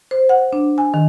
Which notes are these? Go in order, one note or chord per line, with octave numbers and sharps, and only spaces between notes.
C5
F#5
D4
G#5
D#3